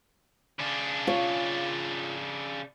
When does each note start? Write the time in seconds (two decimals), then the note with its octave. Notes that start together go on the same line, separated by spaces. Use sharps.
0.60 C#3 D4
1.07 F4 C#5